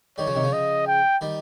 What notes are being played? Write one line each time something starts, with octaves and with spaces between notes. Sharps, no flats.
D#3 G3 C#5
C#3 F3
C3 D#3
C#3 F3
D#5
G5
D#3 G3